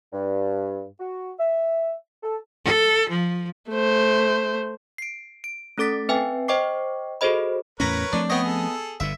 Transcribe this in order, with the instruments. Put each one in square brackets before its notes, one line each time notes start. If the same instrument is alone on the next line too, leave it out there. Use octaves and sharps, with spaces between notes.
[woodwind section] G2
F#4
E5
A4
[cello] A4
F3
[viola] A3 C5
[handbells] C7 D7
D7
A3 C#4 A4 D6 A6 B6
C4 B4 E5 G5 G#5
C5 D#5 G5 C#6 D6 C7
F#4 G#4 A4 C5 D#5 B5
[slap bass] E2 A2 C#4 [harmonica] A#4 B4 C#5 [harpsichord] A#5 B5
[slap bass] F3 A3 C4 [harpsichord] D4
[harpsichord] B3 D#5 [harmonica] C#5 G5
[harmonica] G#4 A4
[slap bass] G1 G2 D3 [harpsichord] E5